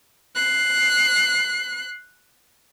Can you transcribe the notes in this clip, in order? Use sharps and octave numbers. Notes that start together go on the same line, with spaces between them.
F#6 C7